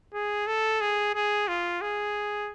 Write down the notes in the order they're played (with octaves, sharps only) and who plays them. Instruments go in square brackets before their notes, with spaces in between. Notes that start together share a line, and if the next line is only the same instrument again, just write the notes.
[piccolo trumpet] G#4
A4
G#4
G#4
F4
G#4